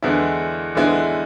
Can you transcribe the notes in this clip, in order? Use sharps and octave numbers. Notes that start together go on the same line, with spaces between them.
E2 D3 G#3 B3 E4
E2 D3 G#3 B3 E4